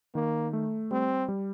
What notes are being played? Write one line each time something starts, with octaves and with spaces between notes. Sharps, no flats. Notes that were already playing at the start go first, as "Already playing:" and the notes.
D#3 A#3
A3
G3 C4
G3